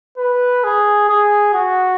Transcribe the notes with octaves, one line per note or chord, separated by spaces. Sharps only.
B4
G#4
G#4
F#4